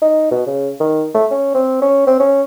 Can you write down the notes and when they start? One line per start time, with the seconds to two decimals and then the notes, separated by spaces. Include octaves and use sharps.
0.02 D#4
0.31 B2
0.46 C#3
0.80 D#3
1.15 A3
1.31 C#4
1.54 C4
1.82 C#4
2.07 C4
2.20 C#4